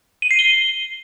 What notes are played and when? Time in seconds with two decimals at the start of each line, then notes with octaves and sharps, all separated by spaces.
0.22 D#7
0.31 C7
0.39 G7